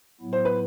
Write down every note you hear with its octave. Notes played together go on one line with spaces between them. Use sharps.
A2 F#3 B3 E4
C5
B4